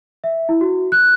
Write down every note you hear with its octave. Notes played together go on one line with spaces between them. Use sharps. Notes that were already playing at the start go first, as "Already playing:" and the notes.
E5
E4
F#4
F#6